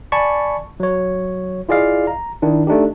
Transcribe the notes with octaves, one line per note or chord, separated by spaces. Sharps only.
D5 G#5 A5 B5 C#6
F#3 C#5
E4 F4 G#4 D5 D#5 F5
A#5
D#3 D4 E4
A3 D4 D#4 G4